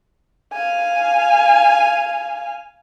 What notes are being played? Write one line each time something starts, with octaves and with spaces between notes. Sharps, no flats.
F5 G#5